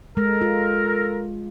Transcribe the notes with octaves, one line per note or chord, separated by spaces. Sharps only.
G#3 A4 A#4
F4